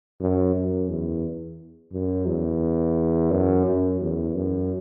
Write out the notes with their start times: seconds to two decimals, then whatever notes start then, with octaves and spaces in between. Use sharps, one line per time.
0.21 F#2
0.55 F#2
0.89 E2
1.92 F#2
2.27 E2
3.31 F#2
3.66 F#2
4.01 E2
4.35 F#2